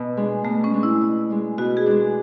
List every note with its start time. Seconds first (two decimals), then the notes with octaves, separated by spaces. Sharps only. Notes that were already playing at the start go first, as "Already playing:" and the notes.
Already playing: B2
0.17 G#3 D4
0.45 B2 A3
0.64 C#4
0.74 G#3 D4
0.83 E4
1.01 B2
1.30 G#3 D4
1.58 B2 F#4
1.77 G#4
1.86 G#3 D4